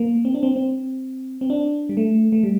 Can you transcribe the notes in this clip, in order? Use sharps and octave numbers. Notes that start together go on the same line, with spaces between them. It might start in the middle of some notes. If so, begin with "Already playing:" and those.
Already playing: A#3
C4
D4
C4
C4
C4
D4
G3
A3
A3
G3